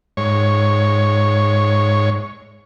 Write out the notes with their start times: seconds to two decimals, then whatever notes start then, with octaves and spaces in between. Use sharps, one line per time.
0.17 G#2 C#5